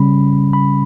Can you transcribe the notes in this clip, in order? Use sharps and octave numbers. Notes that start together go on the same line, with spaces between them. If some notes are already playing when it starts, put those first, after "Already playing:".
Already playing: C#3 G3 C#4 B5
B5